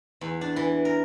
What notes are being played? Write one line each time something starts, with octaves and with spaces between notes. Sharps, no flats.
E2
D4
E3
A#4